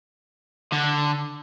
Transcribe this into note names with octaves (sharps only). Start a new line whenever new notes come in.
D3